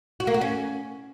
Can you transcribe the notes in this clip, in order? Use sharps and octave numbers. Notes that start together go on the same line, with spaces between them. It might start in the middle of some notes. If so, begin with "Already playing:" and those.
F#4
A#3
F#4
C#4